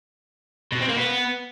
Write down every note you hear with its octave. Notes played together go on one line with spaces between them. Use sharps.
B2
C4
A#3
B3